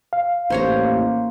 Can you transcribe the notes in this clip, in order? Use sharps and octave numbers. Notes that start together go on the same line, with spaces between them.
F5
A1 A#3 C5 C#5 A#5